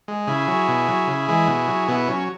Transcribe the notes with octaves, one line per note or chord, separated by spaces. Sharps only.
G#3
C#3 E4 G#4
F#3
B2
F#3
C#3
E3 G#3
B2
F#3
B2 B3 E4
F#3 C#4